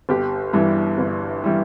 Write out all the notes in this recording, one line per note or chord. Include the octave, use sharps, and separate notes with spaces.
G1 G4
G2 E3 G3
G1
E3 G3